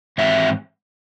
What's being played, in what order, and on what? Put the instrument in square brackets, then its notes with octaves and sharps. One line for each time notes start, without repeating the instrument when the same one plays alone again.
[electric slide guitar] G#2 E3 C4 C#5 E5